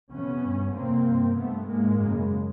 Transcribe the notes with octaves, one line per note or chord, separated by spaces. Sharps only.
F2 C3 B3 C#4
G2
F2 C3 A#3 C4
G2
G2 A3 B3
G#2 G#3 A#3
F#2 C#3